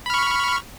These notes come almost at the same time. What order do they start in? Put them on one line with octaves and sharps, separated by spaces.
B5 F6 C#6